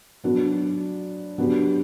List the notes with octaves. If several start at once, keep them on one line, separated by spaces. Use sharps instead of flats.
F#3 B3 D4 F#4
F#3 B3 D4 G4